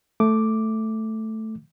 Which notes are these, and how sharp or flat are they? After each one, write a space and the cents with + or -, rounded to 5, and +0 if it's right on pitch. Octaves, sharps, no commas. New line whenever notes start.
A3 +0 D6 +0